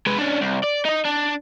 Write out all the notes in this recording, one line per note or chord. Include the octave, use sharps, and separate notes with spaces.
G#3 B4
C#4 D4
C2
D5
D#4 D#5
D4